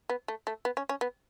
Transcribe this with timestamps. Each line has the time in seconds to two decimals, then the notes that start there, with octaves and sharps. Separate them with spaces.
0.09 B3
0.28 A3
0.47 A3
0.65 B3
0.77 C#4
0.89 C#4
1.01 B3